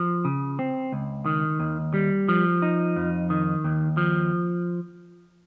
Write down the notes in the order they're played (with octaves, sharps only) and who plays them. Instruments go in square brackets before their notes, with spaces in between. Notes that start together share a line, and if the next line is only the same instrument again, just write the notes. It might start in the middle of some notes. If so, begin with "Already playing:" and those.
Already playing: [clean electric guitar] F3
C#3
C4
C#2
D#3
D#2
G3
F3
D#4
F2
D#3
D#2
F3